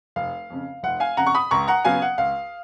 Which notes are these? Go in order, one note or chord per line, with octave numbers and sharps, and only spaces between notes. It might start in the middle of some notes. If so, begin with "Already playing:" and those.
F1 F5
F2 C#3
F1 F#5
F5 G#5
F2 C#3 F#5 A#5
C#6
B5 D#6
C#2 A#5 C#6
F#5 A#5
C#3 F#3 B3 F5 G#5
F#5
C#2 F5